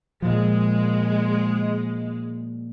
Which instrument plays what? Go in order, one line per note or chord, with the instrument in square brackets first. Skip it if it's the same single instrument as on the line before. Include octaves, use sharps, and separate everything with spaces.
[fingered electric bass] A#2 F3 [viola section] G#3